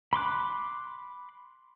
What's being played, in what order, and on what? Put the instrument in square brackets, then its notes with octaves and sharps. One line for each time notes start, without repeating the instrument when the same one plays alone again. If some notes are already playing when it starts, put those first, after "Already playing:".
[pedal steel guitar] B5 C6 D6 F#6